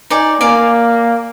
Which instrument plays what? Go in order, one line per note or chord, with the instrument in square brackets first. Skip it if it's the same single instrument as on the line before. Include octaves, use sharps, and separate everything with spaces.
[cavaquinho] D#4 D5 G#5
[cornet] A#3 [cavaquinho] D5 F5 G#5